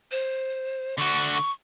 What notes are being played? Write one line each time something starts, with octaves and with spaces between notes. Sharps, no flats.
C5
D3 F#4 C#6
C#6